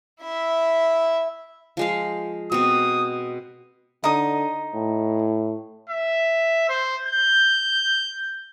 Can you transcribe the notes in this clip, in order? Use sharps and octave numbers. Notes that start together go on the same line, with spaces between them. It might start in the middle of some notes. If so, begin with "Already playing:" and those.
E4 E5
F3 G#3 F5
B2 C4 D#6
D3 D#4 D#6
A2
E5
C5
G6